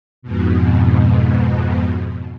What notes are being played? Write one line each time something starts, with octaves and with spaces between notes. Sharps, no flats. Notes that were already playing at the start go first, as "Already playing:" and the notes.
F2 G#2 B2